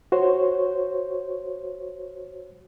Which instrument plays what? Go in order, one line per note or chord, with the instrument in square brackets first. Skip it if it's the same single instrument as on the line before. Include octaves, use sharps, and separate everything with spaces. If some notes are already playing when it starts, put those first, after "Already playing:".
[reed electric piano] F#4 C5 C#5